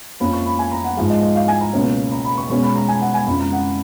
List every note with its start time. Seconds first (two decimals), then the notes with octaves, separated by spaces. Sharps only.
0.20 F2 F3 A#3 C#4 B5
0.33 C#6
0.46 B5
0.59 G#5
0.72 A#5
0.84 F#5
0.97 G#2 F3 G#3 F5
1.10 D#5
1.22 D#5
1.36 F5
1.48 G#5
1.61 A#5
1.74 C#2 B2 A#3 C#4
2.12 A#5
2.25 B5
2.38 C#6
2.50 B2 G#3 C#4 C#6
2.63 B5
2.76 A#5
2.88 G#5
3.01 F#5
3.14 G#5
3.27 F2 C#3 G#3 B5
3.40 A#5
3.52 F#5